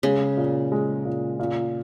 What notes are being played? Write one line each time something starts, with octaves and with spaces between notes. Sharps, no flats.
C#3 G#3
A#2
G#3
A#2
A#2